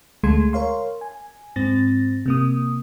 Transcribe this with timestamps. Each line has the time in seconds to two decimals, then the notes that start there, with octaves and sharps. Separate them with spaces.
0.23 D2 G#3 A3 C6 G#6
0.53 A#4 C#5 F5 C6
1.01 G#5
1.56 G#2 C4 A6 A#6
2.26 C3 A#3 D#6